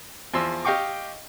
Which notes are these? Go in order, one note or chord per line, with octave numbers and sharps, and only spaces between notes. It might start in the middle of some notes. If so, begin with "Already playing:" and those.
E2 F3 C6 E6
G4 D#5 F5 G5 C#6 D6